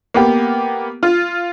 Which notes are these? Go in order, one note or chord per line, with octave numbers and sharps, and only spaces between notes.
A#3 B3 G4
F4